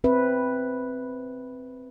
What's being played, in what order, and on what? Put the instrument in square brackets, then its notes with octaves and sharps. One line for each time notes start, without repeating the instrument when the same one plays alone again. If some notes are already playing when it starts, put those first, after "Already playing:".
[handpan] C4 B4 E5